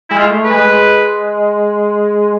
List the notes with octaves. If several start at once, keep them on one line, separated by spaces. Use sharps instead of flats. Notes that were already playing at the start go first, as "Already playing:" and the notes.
G#3 E4
F4
A3
B4
G#3